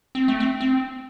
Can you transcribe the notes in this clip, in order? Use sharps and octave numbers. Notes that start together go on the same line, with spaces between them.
C4
A3
C4
C4